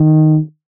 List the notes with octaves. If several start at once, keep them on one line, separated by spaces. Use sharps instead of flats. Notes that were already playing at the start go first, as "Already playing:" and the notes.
Already playing: D#3